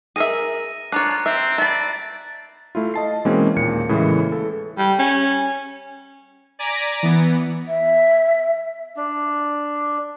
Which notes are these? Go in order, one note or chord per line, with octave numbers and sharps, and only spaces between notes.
G#4 A#4 E5 A#6 D#7
D4 F4 C#5 A#5 F#6
C4 E5
D5 E5 A5 B5 A#6
A3 E4 F4
D#5 A5 C7
B2 E3 G#3 A#3 C4 C#4
D#2 A#2 C#7
A2 C#3 E3 G#3 A#3
A4
G3
C#4
D5 G#5 A#5 D6 A#6 B6
E3 B3
E5
D4